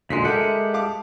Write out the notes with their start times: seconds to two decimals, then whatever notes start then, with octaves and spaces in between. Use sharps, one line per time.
0.10 D2 A#2 G#3 B6 C7
0.25 G#3 G4 A4 A#4 E5 F#5
0.74 F5 A5 D6